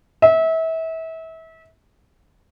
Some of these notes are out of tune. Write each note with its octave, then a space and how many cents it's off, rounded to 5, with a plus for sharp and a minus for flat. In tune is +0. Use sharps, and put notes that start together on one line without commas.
E5 -30